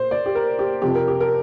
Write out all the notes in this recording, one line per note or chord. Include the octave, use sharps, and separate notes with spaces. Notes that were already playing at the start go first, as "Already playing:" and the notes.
Already playing: A#2 C5
D5
G4
A#4
G4
F2 C3 F3 G4
A#4
G4
A#4